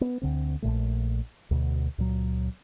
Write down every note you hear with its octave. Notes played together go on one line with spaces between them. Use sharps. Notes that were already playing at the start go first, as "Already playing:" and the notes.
B3
D2 D3 C4
A#1 D#2 A#2 A3
D2 B2
C#2 A#2 F#3